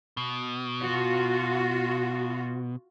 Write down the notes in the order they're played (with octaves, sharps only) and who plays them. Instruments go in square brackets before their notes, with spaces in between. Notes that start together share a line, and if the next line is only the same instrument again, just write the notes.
[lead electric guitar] B2
[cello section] F4 F#4